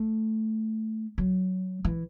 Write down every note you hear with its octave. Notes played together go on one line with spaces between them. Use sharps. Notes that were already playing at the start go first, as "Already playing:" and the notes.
Already playing: A3
F#3
E3